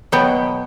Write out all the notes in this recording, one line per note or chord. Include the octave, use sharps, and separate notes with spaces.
B2 F#3 B3 G5